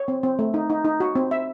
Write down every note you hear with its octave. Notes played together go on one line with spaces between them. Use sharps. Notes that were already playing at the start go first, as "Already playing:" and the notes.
Already playing: C#5
C4
C4
A3
D#4
D#4
D#4
F#4
C4
E5